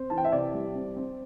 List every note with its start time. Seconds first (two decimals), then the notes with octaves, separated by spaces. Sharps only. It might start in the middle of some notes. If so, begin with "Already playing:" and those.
Already playing: C4 C5
0.10 E3 A5
0.18 G5
0.24 E5
0.32 C3 D5
0.54 G3
0.75 C4
0.97 C4